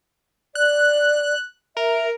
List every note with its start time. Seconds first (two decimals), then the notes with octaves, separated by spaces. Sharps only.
0.55 D5 F#6
1.77 A#4 E5